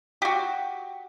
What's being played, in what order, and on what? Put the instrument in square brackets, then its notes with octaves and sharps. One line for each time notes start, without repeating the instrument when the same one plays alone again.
[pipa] F#4 G4